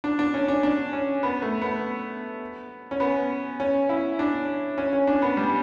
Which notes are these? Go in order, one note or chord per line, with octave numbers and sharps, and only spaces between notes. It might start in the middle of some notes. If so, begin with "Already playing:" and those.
D4
D4
C#4
D4
D4
C#4
B3
A3
B3
C#4
B3
C#4
E4
D4
C#4
C#4
D4
B3
G3